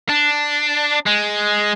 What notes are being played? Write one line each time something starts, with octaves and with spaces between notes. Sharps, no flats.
D4
G#3